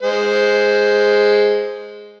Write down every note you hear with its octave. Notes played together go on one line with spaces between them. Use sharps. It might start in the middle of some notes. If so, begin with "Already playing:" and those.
G#3 C5